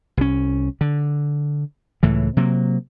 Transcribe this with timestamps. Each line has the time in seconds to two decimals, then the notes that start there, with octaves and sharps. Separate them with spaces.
0.17 C2 C#4
0.81 D3
2.03 C#2 A2 E3
2.37 C3 F#3 A#3